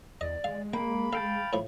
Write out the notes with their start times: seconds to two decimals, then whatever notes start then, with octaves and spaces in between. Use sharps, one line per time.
0.21 E2 D5 D#5
0.44 G#3 F5
0.74 A#3 G5 B5
1.13 A4 F5 G5 A5
1.53 A2 F3